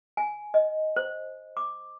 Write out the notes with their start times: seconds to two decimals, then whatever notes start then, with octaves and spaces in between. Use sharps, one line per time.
0.17 G#5
0.54 D#5
0.96 C5
1.57 D6